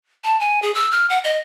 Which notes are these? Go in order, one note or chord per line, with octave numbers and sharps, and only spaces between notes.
A5
G#5
G#4
E6
F6
F#5
D#5